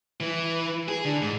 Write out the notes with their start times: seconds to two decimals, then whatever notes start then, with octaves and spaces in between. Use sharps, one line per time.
0.20 E3
0.88 G#4
1.05 D3
1.22 G#2